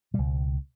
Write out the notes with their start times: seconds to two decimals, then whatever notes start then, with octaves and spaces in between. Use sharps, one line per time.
0.14 B2 G3
0.18 C#2